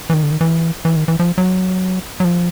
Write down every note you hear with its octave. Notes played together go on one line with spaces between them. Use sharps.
E3
D#3
D3
D#3
E3
E3
D#3
E3
F3
F#3
F#3
F3